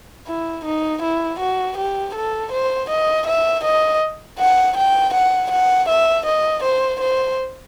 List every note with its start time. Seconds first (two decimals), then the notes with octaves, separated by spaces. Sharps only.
0.28 E4
0.65 D#4
1.02 E4
1.40 F#4
1.77 G4
2.15 A4
2.52 C5
2.90 D#5
3.27 E5
3.64 D#5
4.39 F#5
4.77 G5
5.14 F#5
5.51 F#5
5.89 E5
6.26 D#5
6.64 C5
7.01 C5